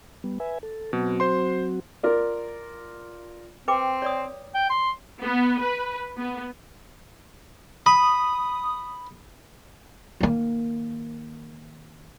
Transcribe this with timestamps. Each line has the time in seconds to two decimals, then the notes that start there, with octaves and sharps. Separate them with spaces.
0.24 G3 B3
0.40 B4 E5 G#5
0.63 A4
0.93 B2 F#3 C4 F#4
1.20 C5 C6
2.03 F4 A#4 D5
3.68 C4 B4 G5 D6
4.02 C#5 D5 D#6
4.54 G5
4.70 C6
5.23 B3
5.60 B4
6.18 B3
7.86 B5 D#6
10.20 D#3 A#3